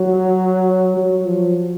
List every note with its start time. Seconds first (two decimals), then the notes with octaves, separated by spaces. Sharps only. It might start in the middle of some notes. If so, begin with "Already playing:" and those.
Already playing: F#3
0.97 F#3
1.26 F3